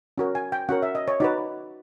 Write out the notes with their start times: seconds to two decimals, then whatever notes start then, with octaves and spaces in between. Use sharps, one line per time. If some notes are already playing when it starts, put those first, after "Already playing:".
0.18 C#4 F#4 A#4
0.35 G#5
0.52 G5
0.69 C#4 F#4 A#4 F#5
0.82 E5
0.95 D#5
1.08 C#5
1.20 D#4 F#4 B4 D5